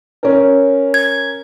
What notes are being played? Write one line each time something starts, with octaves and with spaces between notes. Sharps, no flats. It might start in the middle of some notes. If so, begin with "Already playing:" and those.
C#4 A#4
G#6